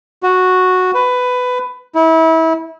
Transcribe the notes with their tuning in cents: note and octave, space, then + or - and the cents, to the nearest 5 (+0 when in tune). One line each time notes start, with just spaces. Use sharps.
F#4 -5
B4 +15
E4 -30